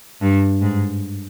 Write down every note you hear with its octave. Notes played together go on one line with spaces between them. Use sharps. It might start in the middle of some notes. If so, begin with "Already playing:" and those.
G2
G#2